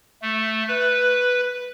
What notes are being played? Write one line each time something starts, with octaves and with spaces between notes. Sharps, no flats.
A3
B4